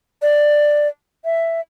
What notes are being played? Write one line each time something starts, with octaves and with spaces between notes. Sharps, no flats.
D5
E5